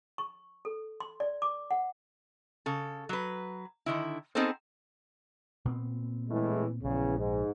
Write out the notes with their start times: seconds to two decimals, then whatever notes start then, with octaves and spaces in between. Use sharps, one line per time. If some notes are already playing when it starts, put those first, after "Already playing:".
0.18 C#6
0.65 A4
1.00 C6
1.20 D5
1.42 D6
1.71 F#5
2.66 C#3 A4
3.09 F#3 B4
3.86 D3 D#3 E4
4.35 B3 C4 D#4 G#4 A4 C5
5.65 A#2 B3 C4
6.29 A2 E3 G#3
6.84 A#1 E2 C#3
7.18 G#2